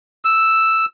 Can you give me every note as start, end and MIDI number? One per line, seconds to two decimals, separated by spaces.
0.25 0.85 88